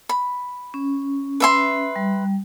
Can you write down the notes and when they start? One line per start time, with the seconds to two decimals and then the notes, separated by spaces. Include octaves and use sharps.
0.09 B5
0.74 C#4
1.40 B4 E5 C6
1.96 G3